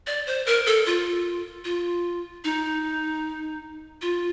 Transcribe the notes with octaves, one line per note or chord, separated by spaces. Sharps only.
D5
C5
A#4
A4
F4
F4
D#4
F4